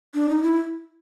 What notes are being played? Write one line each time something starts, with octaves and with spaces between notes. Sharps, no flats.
D4
D#4
E4